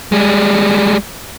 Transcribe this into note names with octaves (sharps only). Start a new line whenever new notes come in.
G3 G#3